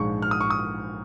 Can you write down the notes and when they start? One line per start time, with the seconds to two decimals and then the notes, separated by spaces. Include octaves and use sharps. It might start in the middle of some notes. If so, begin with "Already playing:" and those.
Already playing: A#1 G#2 F3 G#3 C#6
0.22 F6
0.31 D#6
0.41 C#6
0.50 D#6